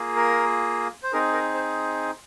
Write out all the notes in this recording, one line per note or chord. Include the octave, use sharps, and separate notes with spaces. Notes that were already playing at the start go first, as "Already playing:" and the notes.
Already playing: A#3 F4 G#4
A#4
C5
C4 D#4 G#4 A#4
A#4
C5